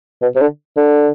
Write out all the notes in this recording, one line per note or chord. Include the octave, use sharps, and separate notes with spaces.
B2
C3
D3
D3